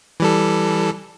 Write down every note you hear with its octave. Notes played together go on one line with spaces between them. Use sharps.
E3 G3 A4